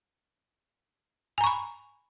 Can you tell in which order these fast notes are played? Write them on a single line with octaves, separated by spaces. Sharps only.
G#5 A#5 C#6 B5